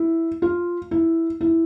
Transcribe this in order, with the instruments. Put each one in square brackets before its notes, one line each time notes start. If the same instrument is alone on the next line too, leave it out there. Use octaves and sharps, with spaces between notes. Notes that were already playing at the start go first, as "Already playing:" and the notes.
Already playing: [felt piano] E4
F4
E4
E4